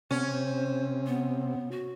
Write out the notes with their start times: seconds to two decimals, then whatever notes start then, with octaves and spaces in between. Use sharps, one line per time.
0.11 C3 B3 C#4
0.30 C5
1.07 B3
1.71 F#4